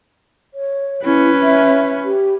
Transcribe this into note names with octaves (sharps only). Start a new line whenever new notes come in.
C#5
C#4 E4 B4
E5
G4